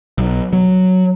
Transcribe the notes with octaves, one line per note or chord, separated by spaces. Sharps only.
B1
F#3